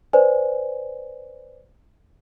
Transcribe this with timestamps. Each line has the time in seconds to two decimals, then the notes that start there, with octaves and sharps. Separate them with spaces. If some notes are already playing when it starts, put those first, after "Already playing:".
0.13 B4 C5 D5 G#5